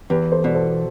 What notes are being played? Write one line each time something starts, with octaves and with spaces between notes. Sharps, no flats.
E2 G4 B4
A4 C5
B2 D5
A4 C5